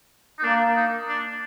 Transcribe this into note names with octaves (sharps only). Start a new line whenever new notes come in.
D#4
A#3 D4
D#4
D4